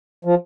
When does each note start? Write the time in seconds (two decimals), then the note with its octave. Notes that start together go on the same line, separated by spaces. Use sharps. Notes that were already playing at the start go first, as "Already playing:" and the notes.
0.25 F3